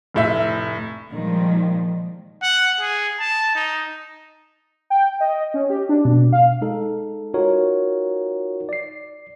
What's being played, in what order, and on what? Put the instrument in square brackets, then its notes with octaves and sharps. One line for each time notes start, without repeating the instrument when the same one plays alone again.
[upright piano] F1 A2 E5
[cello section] A#2 D#3 F3 G3 G#3
[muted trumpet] F#5
G#4
A5
D#4
[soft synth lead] G5
D#5
C#4
G4
D4
B2
F5
[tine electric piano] G#3 D#4 A4
D#4 F4 F#4 A#4 C#5
D5 C7